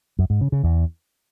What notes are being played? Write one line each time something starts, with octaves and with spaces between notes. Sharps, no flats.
F#2
G#2
C#3
C#3
E2